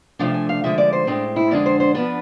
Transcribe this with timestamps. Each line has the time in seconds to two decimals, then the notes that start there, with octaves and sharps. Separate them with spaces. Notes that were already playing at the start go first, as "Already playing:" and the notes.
0.19 C3 F3 A3 D4 F5
0.34 G#5
0.49 F5
0.64 D3 F3 G#3 E5
0.78 D5
0.93 C5
1.07 A2 G#3 C4 D4
1.36 E4
1.51 F2 D3 G#3 D4 D5
1.66 C5
1.80 C5
1.95 F3 B3 D4 B4